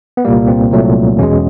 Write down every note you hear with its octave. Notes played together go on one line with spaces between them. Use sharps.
B3
C2 A#2 G3 A#3
C4
C2 A#2 F#3 A3
E2 B2 G#3 C#4